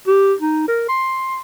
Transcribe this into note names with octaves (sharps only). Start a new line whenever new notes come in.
G4
D#4
A#4
C6